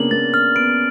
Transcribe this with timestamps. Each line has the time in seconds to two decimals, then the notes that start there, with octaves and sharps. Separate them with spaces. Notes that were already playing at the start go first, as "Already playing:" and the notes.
Already playing: C#3 A#3 B3 D4 F#7
0.11 A#3 A6
0.34 F6
0.55 B3 D7